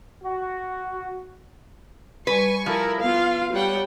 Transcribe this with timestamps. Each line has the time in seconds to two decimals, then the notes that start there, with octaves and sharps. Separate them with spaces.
0.23 F#4
2.27 G3 B4 G#5 C#6
2.66 F3 E4 A#4
3.01 B3 F4 F5
3.53 G3 C#5 F#5 G5